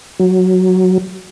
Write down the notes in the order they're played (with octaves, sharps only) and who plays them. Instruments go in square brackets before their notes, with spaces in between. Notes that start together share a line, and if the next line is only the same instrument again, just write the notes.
[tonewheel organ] F#3